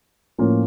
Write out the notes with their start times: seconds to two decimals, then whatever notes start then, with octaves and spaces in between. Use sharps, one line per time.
0.38 A2 F3 A#3 C#4 F4